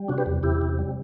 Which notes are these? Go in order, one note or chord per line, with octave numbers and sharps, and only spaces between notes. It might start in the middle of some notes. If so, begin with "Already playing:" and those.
Already playing: G3
C3 D4 F#4
G4 B4
E2
E2 E4 G4
C3
G3